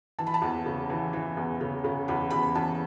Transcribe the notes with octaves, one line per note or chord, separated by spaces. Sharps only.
E3 A5
B5
A5
E2
C#3
E3
E3
E2
C#3
C#3
E2 B5
E2 B5
E2 A5